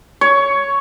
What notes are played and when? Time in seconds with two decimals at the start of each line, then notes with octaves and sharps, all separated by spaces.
0.21 C#5